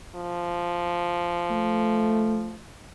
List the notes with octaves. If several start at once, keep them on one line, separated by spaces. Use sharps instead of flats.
F3
A3